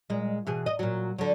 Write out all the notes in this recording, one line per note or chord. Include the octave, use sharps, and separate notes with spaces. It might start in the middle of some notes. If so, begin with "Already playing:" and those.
A#2 G#3
B2 E3 G#4
D#5
A#2 F#3
D3 F#3